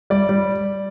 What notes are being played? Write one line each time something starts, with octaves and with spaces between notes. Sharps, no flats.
G3 D5
G3